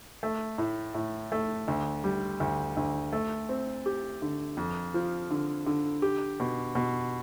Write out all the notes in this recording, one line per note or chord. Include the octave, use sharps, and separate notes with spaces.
A3
A2
A2
A3
D2
G3
D2
D2
A3
C4
G4
D3
F2
F3
D3
D3
G4
B2
B2